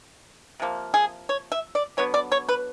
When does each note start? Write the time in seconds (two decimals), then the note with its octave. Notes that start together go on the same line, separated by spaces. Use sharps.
0.60 C3 F3 A#3
0.94 G#4
1.29 C#5
1.52 E5
1.75 D5
1.97 D3 F#3 B3 C#5
2.14 D5
2.32 C#5
2.49 B4